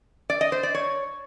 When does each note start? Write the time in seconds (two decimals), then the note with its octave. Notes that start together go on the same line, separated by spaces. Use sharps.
0.30 D5
0.41 D#5
0.52 C5
0.63 D5
0.75 C#5